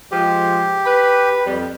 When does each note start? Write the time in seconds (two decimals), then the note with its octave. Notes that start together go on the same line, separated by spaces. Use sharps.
0.11 F3 G#3 G4
0.86 B4
1.46 F2 G3